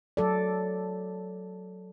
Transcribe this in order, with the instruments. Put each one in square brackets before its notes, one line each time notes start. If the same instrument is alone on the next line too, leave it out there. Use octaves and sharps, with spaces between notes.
[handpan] F#3 A4 D5